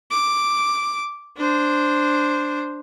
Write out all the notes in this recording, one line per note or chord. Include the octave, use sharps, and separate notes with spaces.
D6
D4 C5